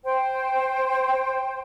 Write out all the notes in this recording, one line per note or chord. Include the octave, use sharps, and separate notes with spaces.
C5 G5